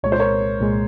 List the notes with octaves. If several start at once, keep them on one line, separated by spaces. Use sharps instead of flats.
C2 A#2 G#3 C#5
C5
A#4 C#5
C2 A#2 G#3